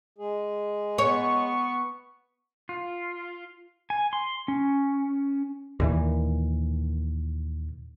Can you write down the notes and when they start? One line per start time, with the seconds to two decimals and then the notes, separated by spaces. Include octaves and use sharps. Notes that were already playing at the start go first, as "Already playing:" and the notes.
0.18 G#3 G#4
0.98 B3 C#5 C#6
2.69 F4
3.90 G#5
4.13 C6
4.48 C#4
5.80 D#2 A#2 E3